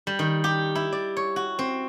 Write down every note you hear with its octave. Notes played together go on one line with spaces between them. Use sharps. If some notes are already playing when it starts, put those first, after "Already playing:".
G3
D#3
G4
E4
D5
C#5
F#4
C4